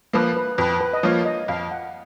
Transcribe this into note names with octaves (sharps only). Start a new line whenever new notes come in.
F3 A#3 B4
B4
F2 B4
B4
D#5
F3 A#3 F4 C#5
D#5
F2 F5
F#5